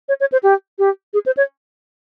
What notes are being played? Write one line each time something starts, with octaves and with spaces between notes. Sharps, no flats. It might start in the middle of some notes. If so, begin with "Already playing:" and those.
C#5
C#5
C5
G4
G4
G#4
C5
C#5